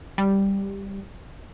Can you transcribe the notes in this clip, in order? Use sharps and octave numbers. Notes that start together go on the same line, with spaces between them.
G3